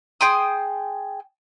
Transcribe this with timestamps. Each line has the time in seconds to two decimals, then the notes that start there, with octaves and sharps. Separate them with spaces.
0.21 G#4 G5 C6 D#6